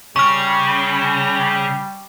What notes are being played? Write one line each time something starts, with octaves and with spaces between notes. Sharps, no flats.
C#3 G3 C#6 F6